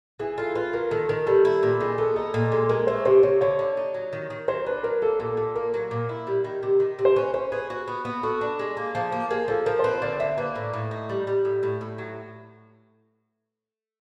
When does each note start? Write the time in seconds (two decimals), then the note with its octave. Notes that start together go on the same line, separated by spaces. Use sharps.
0.20 E3 G#4
0.38 F4 A4
0.55 F4 B4
0.73 F#3 A#4
0.91 D#3 A4
1.09 D#3 A#4
1.26 G3 A4
1.45 E4
1.63 A#2
1.80 D#3 G#4
1.98 B3 A4
2.16 D#4 A4
2.34 A#2 A4
2.52 G#3 A4
2.69 G#3 A#4
2.87 A3 C5
3.05 C3 C5
3.23 C3 C#5
3.41 D3 C#5
3.59 D3
3.77 D#4
3.94 F#3
4.13 D#3
4.30 D#3
4.48 F#3 C5
4.66 D4 B4
4.83 F#3 A#4
5.02 A#3 A4
5.20 A#2 A4
5.37 A#2 A4
5.55 A#3 A#4
5.74 F#3
5.91 A#2
6.09 E4
6.27 G3
6.44 D#3
6.63 C3
6.80 D#3
6.99 C3
7.05 C5
7.16 C#4 B4
7.34 C#4 C5
7.52 G#4 B4
7.70 F#4
7.88 B3
8.05 B3
8.23 F#4 A4
8.41 D4
8.59 G#3
8.77 A#3
8.95 F3
9.12 A#3
9.30 G#3 A#4
9.48 F3 A4
9.66 F3 A#4
9.79 C5
9.84 C4 B4
10.02 D3 D5
10.20 C4 E5
10.38 A#3 B4
10.56 A2
10.73 A2
10.91 D#4
11.09 G3
11.27 G3
11.45 A2
11.63 A2
11.81 A2
11.98 F#3